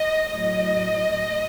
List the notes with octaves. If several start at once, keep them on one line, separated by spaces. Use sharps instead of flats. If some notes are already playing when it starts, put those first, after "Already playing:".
Already playing: D#5
A2 F#3 D#5